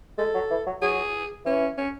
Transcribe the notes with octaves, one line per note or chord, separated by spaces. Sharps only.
G#3 A4
F#3
E3
F#3
F#3 G#4
E3 C#4
C#4